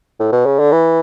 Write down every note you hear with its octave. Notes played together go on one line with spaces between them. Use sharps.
A2
B2
C#3
D3
E3